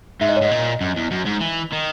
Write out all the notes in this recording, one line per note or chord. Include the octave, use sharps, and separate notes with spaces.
G#2 E5
D#5
C#5
G#2 D#5
A#2
F#2
E2
F#2
G#2
E3
D#3